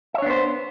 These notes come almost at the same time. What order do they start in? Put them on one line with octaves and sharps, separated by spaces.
E5 C#5 D4 B3 C5